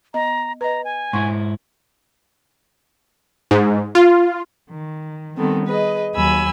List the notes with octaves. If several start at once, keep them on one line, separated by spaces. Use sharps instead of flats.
B3 D#5 A#5
B4 D#5 A#5
G#5
G#2 E4 F#5 C6 C#6
G#2
F4
D#3
D#3 G3 B3 C4 A4
G#4 B4 D#5
D#2 F#3 G#5 B5 E6